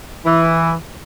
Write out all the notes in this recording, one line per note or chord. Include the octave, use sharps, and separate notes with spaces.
E3